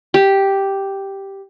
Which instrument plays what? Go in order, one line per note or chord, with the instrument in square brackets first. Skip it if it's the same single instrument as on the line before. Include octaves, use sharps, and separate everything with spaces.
[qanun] G4